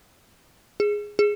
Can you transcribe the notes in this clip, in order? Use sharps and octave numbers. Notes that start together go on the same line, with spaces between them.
G#4
G#4